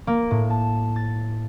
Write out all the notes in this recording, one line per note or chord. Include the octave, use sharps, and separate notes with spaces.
A#3
A2
A5
A6